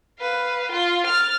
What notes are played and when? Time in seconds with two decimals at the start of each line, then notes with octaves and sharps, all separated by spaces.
0.20 B4 F5
0.72 F4
1.07 F6 A6